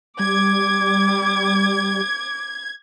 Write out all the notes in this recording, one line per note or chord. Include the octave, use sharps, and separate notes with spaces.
G3 D6 G#6